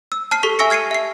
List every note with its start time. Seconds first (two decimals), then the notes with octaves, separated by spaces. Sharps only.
0.12 E6
0.31 A5 F6 C7
0.43 G4 A4 C#6 B6 G7
0.59 E5 G#5 C#6 E6 A#6 C#7
0.70 F6 G#6 C7 C#7 D#7
0.91 E5 C7